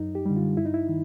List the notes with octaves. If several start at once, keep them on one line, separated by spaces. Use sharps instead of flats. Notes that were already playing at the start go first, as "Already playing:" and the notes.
Already playing: F#2 D#4
G4
D3 G3
F4
G2 E4
D#4
E4
D#3